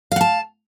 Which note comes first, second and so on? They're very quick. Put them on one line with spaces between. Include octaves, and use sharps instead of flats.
F5 F#5 A5